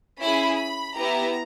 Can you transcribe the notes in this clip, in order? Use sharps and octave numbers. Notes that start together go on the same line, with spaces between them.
C#4 E4 G#4 B5
B5
B3 E4 G4 A#5